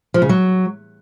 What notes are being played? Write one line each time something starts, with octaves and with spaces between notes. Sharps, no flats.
F3
C#3
F#3